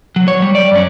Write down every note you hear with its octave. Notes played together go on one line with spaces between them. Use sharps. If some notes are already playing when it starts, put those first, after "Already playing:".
F#3
C#5
G3
D5
F#2 C#4